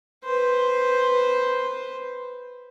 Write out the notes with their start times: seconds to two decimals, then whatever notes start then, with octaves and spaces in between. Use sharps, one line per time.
0.25 B4 C5